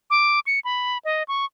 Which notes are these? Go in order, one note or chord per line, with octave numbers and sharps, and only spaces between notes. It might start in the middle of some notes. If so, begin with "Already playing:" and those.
D6
C#7
B5
D#5
C#6